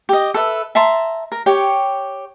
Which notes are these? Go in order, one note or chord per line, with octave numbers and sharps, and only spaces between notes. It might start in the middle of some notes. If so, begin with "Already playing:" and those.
G4 D#5
A4 B4 E5
E5 A5 A#5 C6
A#4
G4 C#5 G5